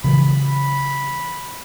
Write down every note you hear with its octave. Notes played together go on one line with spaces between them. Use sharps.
C#3 E3 F#3 B5